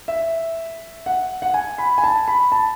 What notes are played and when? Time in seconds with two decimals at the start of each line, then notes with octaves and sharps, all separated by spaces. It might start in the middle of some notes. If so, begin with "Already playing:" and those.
0.08 E5
1.06 F#5
1.42 F#5
1.54 G#5
1.78 B5
1.98 G#5
2.04 A5
2.28 B5
2.52 A5